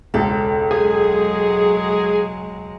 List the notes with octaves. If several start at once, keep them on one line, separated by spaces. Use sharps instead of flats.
E1 C#2 A4
F#3 G#3 G#4